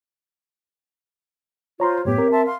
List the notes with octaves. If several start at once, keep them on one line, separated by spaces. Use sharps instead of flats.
F4 C5 C#5 A#5 C6
F#2 A2 B3 G4 C#5 E5
C4 A#4
E5 A5 C6
F5 C6